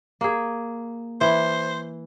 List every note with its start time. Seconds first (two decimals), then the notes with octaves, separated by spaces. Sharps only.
0.21 A#3 G#4
1.21 E3 C5 E5